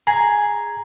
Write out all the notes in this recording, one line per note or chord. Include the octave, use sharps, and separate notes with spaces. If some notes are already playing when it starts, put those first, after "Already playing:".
G#4 A#5